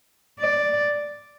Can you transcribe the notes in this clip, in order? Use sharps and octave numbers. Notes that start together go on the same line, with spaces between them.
D5